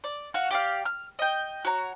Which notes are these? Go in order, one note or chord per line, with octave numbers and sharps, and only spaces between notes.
D5
F#4 F5 F#5
G4 D5 F5
F6
D#5 G5
F#4 C#5 A#5